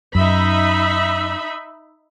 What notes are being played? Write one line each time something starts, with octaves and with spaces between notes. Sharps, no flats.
F#2 D#4 E5 B5